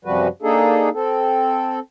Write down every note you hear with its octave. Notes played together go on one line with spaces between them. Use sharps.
F#2 C3 F3 G3 F#4 B4
A#3 D4 D#4 G#4 A4
C4 A4